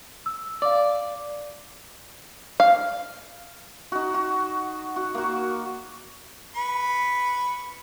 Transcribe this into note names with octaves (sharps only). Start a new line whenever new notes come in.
E6
D5 F5 D6
F5
D#4 F#4
F#4
F#4
A#3 F#4
B4 B5 C#6